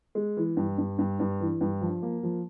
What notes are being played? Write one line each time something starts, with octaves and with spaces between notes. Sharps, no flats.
G#3
E3
G2
G2
G2
G2
E3
G2
F3
A#3
F3